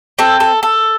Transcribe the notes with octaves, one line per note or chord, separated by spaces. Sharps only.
C4 A4
A4
A4